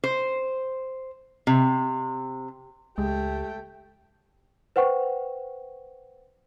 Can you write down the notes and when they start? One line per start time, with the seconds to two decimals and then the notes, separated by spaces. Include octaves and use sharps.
0.04 C5
1.47 C3
2.98 C#2 G#3 A3 G4 G5
4.76 B4 C5 F#5 G5 C#6